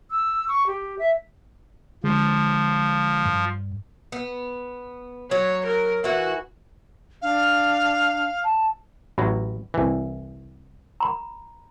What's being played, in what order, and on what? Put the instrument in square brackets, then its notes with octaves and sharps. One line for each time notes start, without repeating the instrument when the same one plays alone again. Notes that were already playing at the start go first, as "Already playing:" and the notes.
[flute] E6
C#6
G4
E5
[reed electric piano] D3 G#3 [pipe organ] F3
[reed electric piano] G2
[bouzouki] B3
[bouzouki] F#3 [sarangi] C#5
[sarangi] A#4
[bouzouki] E3 E4 [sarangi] F#4
[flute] D4 [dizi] F5
[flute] A5
[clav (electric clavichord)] A1 F#3 [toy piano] B5
[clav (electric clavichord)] C2 E3
[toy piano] A#5 B5